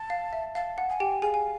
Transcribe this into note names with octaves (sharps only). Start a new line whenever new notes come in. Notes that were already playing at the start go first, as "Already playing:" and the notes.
Already playing: A5
F5
E5
F5 A5
F#5
G#5
G4 G5
G#4 F5 G#5
G#5